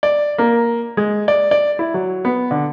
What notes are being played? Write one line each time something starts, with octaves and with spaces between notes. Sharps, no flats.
D5
A#3
G#3
D5
D5
E4
F#3
B3
D3